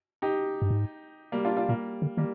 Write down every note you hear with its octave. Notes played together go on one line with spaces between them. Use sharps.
D#4 G4
G2
G#2
G3 A#3
D4 F4
D4 F4
A#2 G3 A#3
D3
D#3 G3 A#3